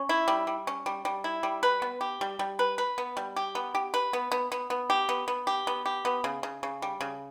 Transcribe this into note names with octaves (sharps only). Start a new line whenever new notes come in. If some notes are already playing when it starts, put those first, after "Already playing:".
Already playing: C#4
E4
G3
G3
C#4
G3
G3
E4
G3
B4
B3
G4
G3
G3
B4
B4
B3
G3
G4
B3
G4
B4
B3
B3
B3
B3
G4
B3
B3
G4
B3
G4
B3
C#3
C#3
C#3
G3
C#3